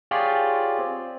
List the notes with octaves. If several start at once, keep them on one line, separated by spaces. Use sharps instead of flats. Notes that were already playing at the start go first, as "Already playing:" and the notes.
F4 G4 G#4 C#5 D5
C4